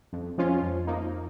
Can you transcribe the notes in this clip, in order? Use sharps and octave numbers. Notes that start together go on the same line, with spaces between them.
F2
F3 G#3 C#4 F4
F2
F3 A#3 D#4